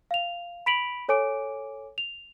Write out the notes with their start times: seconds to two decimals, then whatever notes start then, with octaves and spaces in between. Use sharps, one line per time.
0.11 F5 F7
0.66 B5 B6 D7 F7 F#7
1.08 A4 C#5 G#5 D6 D7
1.98 F7